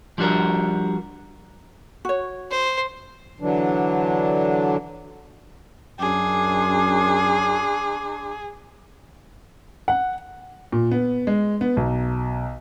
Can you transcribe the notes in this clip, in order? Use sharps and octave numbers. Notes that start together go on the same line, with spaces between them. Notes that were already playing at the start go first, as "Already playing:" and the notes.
F3 G3 D4 F#4 A#4
F#4 C#5
C5
D3 E3 F#3 D4
F#2 D4 G#4 C6 D6
F#5
A#2
B3
G#3
B3
B1